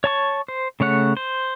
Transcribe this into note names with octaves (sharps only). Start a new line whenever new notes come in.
C#5 A5 C#6
C5
C#3 A3 C#5 F#5
C5